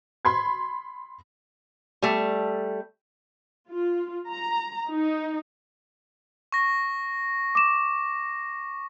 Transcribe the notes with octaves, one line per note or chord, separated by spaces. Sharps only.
B5 C6 G#6
G3 A3
F4
A#5
D#4
C#6 A#6
D6 E7